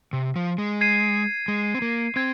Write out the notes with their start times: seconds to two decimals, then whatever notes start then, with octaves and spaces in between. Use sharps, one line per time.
0.13 C3
0.36 F3
0.58 G#3
0.81 G#6 C7 D#7
1.48 G#3
1.75 C4
1.82 A#3
2.16 C4 G#6